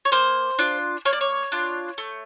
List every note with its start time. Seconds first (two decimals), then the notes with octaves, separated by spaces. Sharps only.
0.05 C#5
0.12 A#3 C5
0.59 D4 F4
1.05 A#3 C#5
1.13 D5
1.21 C#5
1.52 D4 F4
1.98 A3